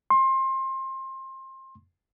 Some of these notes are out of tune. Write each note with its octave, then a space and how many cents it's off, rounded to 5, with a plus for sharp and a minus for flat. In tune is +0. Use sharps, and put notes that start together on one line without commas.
C6 +25